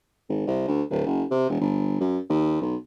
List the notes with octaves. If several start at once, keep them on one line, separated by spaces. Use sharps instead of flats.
G#1
C2
D2
D1
F#1
C3
E1
G1
F#2
D#2
B1